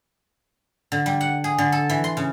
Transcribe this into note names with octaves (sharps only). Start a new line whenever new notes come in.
D3
G3
F#5
G#4
D3
A4
E3
C6
C#3